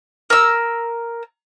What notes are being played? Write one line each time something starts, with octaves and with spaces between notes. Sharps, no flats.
A#4 E6